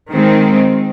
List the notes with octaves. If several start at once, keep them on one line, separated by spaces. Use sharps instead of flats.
D#3 G#3 C4